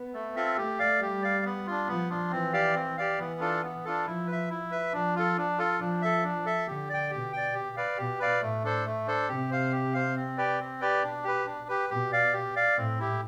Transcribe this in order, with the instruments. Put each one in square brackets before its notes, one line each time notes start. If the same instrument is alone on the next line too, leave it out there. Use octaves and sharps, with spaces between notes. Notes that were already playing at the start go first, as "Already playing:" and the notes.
Already playing: [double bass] B3
[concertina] A3
C4 F4 A4 E5
[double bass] A3 [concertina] G4
[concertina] D5 F5
[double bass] G3 [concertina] G4
[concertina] D5 F5
B3
D4 F4
[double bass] F3 [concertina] B3
[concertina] D4 F4
[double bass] E3 [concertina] C4
[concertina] G4 D5 F5
C4
G4 D5 F5
[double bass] E3 [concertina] B3
[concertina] D4 F4 A4
B3
D4 F4 A4
[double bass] F3 [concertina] E4
[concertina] B4
E5
E4
B4 E5
[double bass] F3 [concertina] D4
[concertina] F4 A4
D4
F4 A4
[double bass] F3 [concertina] D4
[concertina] A4 E5
D4
A4 E5
[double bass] D3 [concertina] G4
[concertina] D5 G5
[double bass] B2 [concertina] G4
[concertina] D5 G5
G4
B4 D5 F5
[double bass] B2 [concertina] G4
[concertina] B4 D5 F5
[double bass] A2 [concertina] A3
[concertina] D4 A4 C5
A3
D4 A4 C5
[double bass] C3 [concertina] G4
[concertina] C5 F5
G4
C5 F5
C4
G4 B4 D5 G5
C4
G4 B4 D5 G5
[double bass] B2 [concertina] D4
[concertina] G4 B4
D4
G4 B4
[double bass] B2 [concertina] G4
[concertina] D5 F5
G4
D5 F5
[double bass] A2 [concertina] C4
[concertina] E4 G4